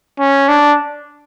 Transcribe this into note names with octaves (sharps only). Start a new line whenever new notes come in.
C#4
D4